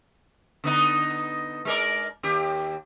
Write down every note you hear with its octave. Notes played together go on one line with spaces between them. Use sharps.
D3 B3 D#4
G#3 A#4 D5
D#2 G4